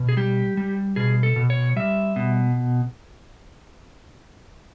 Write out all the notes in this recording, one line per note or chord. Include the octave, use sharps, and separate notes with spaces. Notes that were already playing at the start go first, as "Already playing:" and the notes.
Already playing: B2
G#4
G3 G4
G3
B2 G#4
A4
B2
C#5
G3 E5
B2